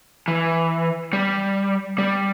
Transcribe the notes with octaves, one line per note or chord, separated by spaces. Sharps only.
E3
G3
G3